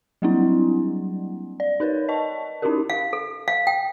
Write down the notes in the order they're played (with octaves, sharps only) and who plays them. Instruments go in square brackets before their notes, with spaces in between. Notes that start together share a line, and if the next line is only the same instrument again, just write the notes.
[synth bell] F#3 G3 A#3 C4 D4 E4
D5
D#4 A#4 B4 C#5
D#5 A5 C#6
C#4 D#4 E4 F#4 G4 A#4
[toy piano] F5
A4
F5
G5